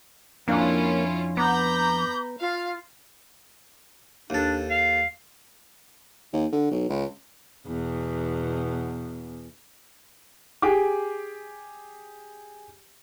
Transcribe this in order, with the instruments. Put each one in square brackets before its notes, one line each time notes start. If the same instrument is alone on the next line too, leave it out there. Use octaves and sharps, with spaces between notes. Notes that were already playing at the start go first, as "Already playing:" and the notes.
[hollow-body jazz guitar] F2 D4 F5 [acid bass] A#3 [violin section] C#4 E4 F4
[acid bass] B3 [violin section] A#5 B5 G6 [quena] D6
[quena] F4 [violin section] F5
[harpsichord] D#2 A4 [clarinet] D4
[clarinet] F5
[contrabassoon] D#2
D3
B1
C#2
[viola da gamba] E2 B2
[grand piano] G4 G#4 D6